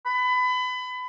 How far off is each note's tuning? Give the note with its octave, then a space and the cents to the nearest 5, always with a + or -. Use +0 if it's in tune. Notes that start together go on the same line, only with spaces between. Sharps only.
B5 +25